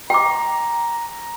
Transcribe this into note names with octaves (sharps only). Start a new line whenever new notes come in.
G5 A#5 D6